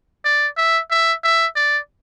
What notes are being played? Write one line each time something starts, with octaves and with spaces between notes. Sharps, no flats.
D5
E5
E5
E5
D5